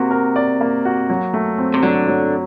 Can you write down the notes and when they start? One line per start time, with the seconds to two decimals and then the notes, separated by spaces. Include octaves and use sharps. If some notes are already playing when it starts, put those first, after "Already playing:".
Already playing: C3 A#3 F#4
0.11 A#4
0.36 D5
0.61 A#3
0.85 F#4
1.10 F#3
1.34 A3
1.58 C4
1.74 C3
1.83 D3 F#3
2.07 F#3